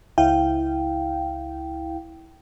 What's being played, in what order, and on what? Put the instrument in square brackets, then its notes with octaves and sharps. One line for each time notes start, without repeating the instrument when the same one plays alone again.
[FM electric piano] C#2 E4 F5 G5